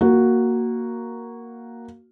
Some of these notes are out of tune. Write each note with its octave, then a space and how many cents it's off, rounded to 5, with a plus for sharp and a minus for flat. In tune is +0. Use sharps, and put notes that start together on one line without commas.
A#3 +0 F#4 +0